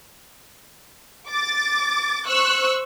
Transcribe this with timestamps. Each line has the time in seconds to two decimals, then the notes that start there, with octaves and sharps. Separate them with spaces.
1.29 D6 A6
2.27 C5 C#6 E6 F#6